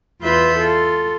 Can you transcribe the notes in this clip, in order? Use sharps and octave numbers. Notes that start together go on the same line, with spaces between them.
E2 F4 B4 E5 B5 G6
F4 A4